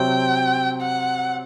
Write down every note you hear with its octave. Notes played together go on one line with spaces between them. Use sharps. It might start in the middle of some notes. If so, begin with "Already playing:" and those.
Already playing: C3 F#3 C4 G5
F#5